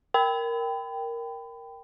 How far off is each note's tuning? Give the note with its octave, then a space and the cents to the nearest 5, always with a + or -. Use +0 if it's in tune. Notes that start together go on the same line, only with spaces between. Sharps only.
A#4 +0 G5 +0 B5 +30